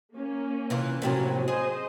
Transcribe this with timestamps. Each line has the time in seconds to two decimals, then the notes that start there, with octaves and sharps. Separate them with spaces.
0.16 A#3 C#4
0.70 C3 E3 F4
1.02 A2 C3 F3 F#3 A#3 C#4
1.48 G#4 C5 D#5